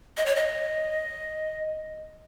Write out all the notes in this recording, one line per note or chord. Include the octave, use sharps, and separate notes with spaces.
D#5
C#5
D#5